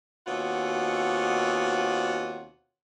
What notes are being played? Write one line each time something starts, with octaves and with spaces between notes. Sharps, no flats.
D#2 B2 C4 F4 C#5 F#5